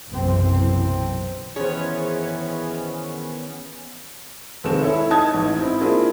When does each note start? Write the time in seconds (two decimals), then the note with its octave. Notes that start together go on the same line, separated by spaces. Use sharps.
0.11 F#1 B1 F#2 C3 E3 C4
1.56 D#3 E3 B3 C#4 G#4 C5 C#5
4.64 F1 D#2 G#3 C4 A4 E7
4.81 E4 A4 C#5 E5
5.11 D#4 A5 D#6 G#6
5.34 A1 G#2
5.58 C4 E4
5.81 A#3 C4 D4 E4 F4 G#4